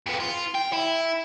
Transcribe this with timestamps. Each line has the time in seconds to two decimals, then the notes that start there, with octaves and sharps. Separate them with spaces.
0.06 F2 B3
0.20 F4
0.55 G5
0.73 E4